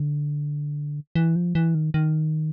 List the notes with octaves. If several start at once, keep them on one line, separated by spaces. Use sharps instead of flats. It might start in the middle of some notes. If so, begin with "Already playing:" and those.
Already playing: D3
E3
F3
E3
D#3
D#3